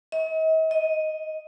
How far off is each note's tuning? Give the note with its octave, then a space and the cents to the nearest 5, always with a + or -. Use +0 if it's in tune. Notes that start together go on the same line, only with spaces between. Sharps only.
D#5 +45
D#5 +5